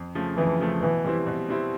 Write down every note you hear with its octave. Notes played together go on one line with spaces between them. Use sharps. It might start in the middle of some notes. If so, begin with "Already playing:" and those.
Already playing: F2
C#3 F3 A3
F2 E3
C#3 F3 A3
B2 E3
G3 C4 E4
B2
G3 C4 E4